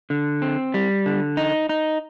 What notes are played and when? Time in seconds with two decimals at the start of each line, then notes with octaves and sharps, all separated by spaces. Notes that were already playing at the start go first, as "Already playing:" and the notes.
0.10 D3
0.42 C4
0.74 G3
1.06 D3
1.37 D#4
1.69 D#4